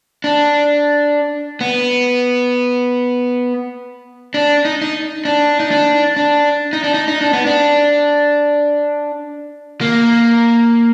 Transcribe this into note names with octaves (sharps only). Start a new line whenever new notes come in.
D4
B3
D4
D#4
D#4
D4
D#4
D4
D4
D#4
D4
D#4
D#4
D4
B3
D4
A#3